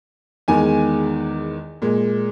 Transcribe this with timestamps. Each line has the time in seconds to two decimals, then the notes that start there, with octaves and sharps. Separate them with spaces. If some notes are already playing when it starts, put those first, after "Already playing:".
0.48 E2 D#3 G#3 G#5
1.82 A#2 G#3